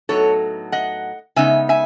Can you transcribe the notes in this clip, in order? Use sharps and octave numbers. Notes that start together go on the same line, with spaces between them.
A2 F#3 B3 D#4 A4 C#5
D#5 F#5
C#3 G#3 B3 D#4 E5 G#5
E5 G#5